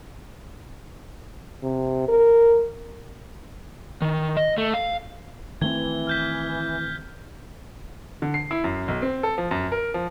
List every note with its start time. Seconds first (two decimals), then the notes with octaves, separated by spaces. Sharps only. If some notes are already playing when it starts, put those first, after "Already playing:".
1.63 C3
2.09 A#4
4.02 D#3
4.37 D#5
4.58 A3
4.74 F5
5.61 D#3 E3 A3 C4 G#6 G7
6.07 F6 G6 B6
8.22 D3
8.34 C7
8.51 E4
8.64 F#2
8.88 B1
9.02 C4
9.23 A4
9.38 F3
9.51 F#2
9.72 A#4
9.94 F3